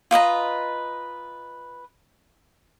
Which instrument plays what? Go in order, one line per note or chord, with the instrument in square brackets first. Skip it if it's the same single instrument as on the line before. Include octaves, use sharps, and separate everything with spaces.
[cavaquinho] F4 B4 D#5 A#5